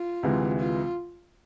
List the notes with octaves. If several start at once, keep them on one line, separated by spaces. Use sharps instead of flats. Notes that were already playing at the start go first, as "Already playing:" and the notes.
Already playing: F4
D2 C3 E3 G#3
F4